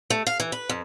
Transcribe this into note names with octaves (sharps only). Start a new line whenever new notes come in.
A3
F5
E3
B4
F2